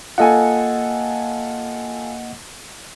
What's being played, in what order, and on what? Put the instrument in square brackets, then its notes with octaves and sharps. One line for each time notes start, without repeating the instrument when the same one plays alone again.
[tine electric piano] A#3 D#5 F#5 [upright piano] F4 A4 G#5